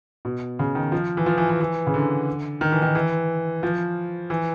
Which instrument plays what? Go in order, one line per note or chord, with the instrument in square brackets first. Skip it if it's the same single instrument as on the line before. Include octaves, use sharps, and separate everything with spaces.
[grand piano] B2
C#3
D#3
F3
E3
F3
E3
E3
E3
C#3
D3
D#3
E3
D#3
E3
F3
E3